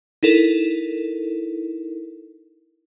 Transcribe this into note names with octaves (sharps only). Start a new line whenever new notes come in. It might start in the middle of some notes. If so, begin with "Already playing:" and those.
D#4 E4 A4 A#4